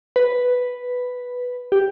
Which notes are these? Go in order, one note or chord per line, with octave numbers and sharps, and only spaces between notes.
B4
G4